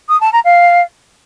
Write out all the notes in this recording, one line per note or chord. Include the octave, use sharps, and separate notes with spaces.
D#6
A5
A#5
F5